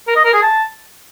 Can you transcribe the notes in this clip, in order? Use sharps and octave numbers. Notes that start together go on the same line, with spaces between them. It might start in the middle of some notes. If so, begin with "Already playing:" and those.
A#4
D#5
A#4
G#4
A5